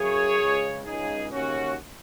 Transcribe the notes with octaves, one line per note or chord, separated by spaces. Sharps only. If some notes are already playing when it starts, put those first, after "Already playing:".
Already playing: F#2 C#3 G#4 C#5
C#2 C#3
C#2 C#3 D#4 G#4
D#2 C#3 C#4 F#4